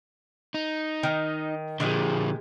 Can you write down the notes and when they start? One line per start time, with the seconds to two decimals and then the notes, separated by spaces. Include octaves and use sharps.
0.54 D#4
1.03 D#3
1.80 A#2 D3 F3 G#3 G4